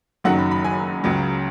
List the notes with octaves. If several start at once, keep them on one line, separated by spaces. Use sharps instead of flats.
F#1 F#2 D#3 F#3 F#5
B5
B5
G#5
C#2 C#3 F#3